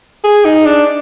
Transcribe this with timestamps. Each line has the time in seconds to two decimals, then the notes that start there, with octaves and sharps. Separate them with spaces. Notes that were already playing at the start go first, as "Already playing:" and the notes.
0.24 G#4
0.45 D#4
0.66 D4